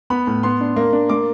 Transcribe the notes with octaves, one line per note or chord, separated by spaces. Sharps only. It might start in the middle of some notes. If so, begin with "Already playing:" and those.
B3 B5
A2
B3 C6
D4
A#3
D4
A#3 D6